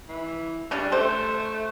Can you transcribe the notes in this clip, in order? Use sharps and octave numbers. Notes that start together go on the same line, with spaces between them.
E3
C#3 G3 C#4 D4
A3 A4 C5